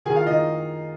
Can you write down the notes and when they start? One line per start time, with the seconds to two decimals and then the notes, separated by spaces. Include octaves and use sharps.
0.06 D#3 G#4 G#5
0.16 F4 F5
0.27 D#3 D#4 D#5